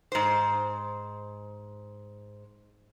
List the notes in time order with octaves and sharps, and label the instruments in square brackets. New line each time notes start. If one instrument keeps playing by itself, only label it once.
[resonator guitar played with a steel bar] G#2 C5